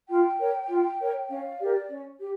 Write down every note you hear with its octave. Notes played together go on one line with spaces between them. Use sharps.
F4 G5
A#4 C#5
F4
A#4 C#5
C#4 F5
G4 A#4 D5
C#4
G4